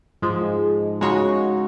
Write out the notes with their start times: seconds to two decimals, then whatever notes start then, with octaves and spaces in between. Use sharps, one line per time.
0.22 G#2 F3 G#3
1.01 C#3 G#3 D#4 F#4 C#5